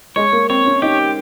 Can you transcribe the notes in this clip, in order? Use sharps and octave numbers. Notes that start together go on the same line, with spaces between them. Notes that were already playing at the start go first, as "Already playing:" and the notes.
G#3 C#5
A#3
C4 C#5
C#4
D#4 G4